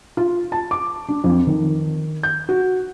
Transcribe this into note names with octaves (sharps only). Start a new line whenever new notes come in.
F4
A5
D6
D4
F2
D#3
G6
F#4